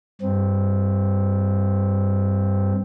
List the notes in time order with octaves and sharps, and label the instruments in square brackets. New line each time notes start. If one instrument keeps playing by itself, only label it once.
[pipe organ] G2 C4